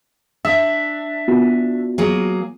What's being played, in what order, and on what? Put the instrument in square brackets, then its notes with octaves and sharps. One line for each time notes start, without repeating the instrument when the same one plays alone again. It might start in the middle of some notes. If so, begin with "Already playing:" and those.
[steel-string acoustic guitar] D4 [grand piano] E5
[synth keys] B3 F4 F#4
[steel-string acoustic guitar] F#3 A#3 G#4